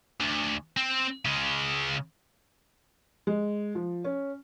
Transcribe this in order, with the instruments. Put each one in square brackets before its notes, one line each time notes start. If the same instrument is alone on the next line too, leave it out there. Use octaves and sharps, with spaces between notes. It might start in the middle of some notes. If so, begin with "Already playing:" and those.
[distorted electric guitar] D2
C4
C#3 G#3
[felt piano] G#3
F3
C#4